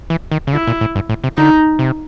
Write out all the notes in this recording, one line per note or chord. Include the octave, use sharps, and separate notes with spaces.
E3
D#3
C#3
D3 E4
A#2
A2
G2
A2
C3
D3 D#4
C3